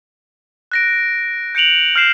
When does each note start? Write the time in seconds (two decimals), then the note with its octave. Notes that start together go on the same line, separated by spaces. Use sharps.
0.72 F#6 A#6 D7
1.55 G6 C#7 D7 F7 F#7
1.96 F6 G6 C7 E7